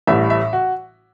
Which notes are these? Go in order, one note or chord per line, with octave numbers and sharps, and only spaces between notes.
A1 A2 E3 G3 E5
E5
F#4